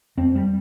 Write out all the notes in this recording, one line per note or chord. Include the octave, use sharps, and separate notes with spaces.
F2 C4
G3